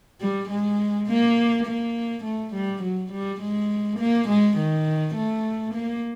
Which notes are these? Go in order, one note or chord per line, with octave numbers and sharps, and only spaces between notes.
G3
G#3
A#3
A#3
A3
G3
F#3
G3
G#3
A#3
G#3
D#3
A3
A#3